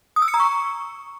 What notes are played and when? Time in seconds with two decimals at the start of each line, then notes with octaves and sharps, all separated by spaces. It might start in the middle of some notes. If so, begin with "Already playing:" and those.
0.16 D#6
0.22 E6
0.28 C#7
0.34 A#5
0.40 C#6